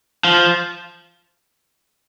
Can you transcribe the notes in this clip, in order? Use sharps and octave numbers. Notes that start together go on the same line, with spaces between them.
F3